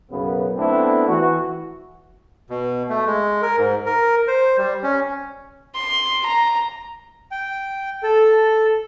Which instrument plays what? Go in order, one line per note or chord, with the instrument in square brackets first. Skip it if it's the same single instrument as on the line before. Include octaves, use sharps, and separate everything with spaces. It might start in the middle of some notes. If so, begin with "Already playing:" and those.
[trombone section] B1 F#2 C#3 B3
A3 B3 C4 D4 E4
E3 F#4
[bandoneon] B2
A3
G#3
A#4
G#2
A#4
C5
G3
C#4
[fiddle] C6
A#5
[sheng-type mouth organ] G5
A4